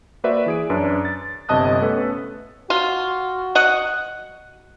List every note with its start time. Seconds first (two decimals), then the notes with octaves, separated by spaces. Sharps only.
0.24 A#3 F#4 B4 C5 D5 E5
0.46 E3 G#4 D7
0.70 F#2 D4 B4
1.05 A6
1.49 G1 C3 D#5 A5 D#6 F#6
1.80 A3 B3 C#4 A4 B4
2.70 F4 F#4
3.55 D#5 F#5